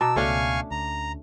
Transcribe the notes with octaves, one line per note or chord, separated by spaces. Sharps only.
B2 A5 A#5 D6 E6
C#2 B2 A3 C#4 D4 F5 G#5 C#6
D2 A#5